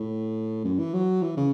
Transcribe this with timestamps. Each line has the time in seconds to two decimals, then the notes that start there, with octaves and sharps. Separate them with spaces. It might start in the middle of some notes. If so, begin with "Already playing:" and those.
Already playing: A2
0.65 F#2
0.79 E3
0.94 F#3
1.22 E3
1.37 C#3